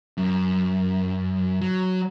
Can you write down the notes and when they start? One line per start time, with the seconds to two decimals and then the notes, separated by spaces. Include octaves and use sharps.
0.17 F#2
1.61 F#3